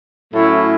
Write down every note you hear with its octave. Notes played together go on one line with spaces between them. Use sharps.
A2 F#3 A3 C#4 E4